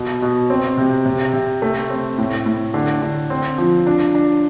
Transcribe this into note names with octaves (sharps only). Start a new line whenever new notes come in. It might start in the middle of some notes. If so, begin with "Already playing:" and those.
Already playing: B2
B2
C4
C3
C3
C3
A3
C4
A2
A2
D3
D3
C4
F3
D4
D4